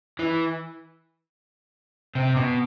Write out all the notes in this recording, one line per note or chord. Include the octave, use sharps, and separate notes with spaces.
E3
C3
B2